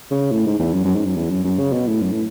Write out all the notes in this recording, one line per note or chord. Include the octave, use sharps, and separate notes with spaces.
C#3
A2
G#2
E2
F#2
F#2
G#2
F#2
E2
F#2
F#2
C#3
B2
A2
F#2
A2